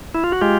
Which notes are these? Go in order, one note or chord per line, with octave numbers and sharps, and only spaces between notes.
E4
F4
F#4
G#3 F4 G4